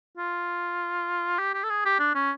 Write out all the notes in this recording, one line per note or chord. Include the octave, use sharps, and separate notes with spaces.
F4
G4
G4
A4
G#4
G4
D4
C#4